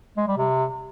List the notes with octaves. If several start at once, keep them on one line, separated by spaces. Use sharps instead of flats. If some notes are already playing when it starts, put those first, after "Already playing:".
G#3
G3
C3